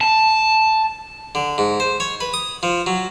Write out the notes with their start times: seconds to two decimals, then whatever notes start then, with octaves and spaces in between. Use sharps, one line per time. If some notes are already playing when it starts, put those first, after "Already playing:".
0.01 A5
1.35 D3
1.58 G#2
1.80 C5
2.00 C#5
2.21 B4
2.34 D#6
2.63 F3
2.86 F#3